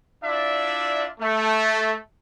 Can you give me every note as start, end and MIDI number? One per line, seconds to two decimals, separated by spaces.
0.24 1.06 62
0.24 1.06 64
0.24 1.06 65
0.24 1.06 74
0.24 1.06 76
1.20 1.94 57